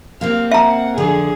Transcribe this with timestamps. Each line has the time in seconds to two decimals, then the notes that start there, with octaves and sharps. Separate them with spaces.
0.21 C3 A#3 C4 F5
0.52 E5 F#5 A#5
0.98 F2 D3 G#4